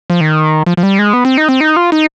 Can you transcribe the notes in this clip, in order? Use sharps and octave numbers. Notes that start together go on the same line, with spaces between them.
F3
D#3
F3
F3
G3
G#3
B3
C4
D#4
C4
D#4
F4
D#4